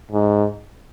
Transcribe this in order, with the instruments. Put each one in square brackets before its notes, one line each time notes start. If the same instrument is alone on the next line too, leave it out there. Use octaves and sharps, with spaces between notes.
[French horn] G#2